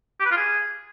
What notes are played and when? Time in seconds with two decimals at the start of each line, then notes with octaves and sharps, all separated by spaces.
0.20 G4
0.26 B4
0.31 F4
0.37 G#4